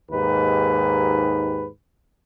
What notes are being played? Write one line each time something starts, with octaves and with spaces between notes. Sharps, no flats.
D#2 G#2 D#4 G4 B4